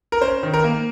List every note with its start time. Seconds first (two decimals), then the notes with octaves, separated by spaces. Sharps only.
0.12 A#4
0.21 C#4 C5
0.43 D#3
0.54 A#4
0.64 A#3